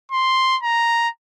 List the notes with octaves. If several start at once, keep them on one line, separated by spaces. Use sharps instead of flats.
C6
A#5